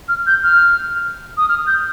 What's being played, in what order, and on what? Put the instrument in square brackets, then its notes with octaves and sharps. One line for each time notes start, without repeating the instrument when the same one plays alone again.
[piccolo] F6
G6
F6
D#6
F6
G6